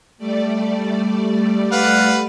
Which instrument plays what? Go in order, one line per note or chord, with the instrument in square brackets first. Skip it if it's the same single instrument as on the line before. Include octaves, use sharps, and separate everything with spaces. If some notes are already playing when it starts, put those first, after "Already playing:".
[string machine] G3 A3 D5
[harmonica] B4 F5 F#5